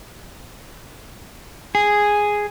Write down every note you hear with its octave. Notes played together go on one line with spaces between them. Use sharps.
G#4